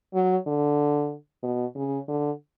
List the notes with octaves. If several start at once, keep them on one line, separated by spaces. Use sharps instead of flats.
F#3
D3
B2
C#3
D3